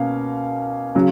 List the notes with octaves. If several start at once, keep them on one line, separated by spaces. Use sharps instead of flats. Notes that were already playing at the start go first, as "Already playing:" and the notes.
Already playing: B2 A#3 C#4 F5
C#3 F#3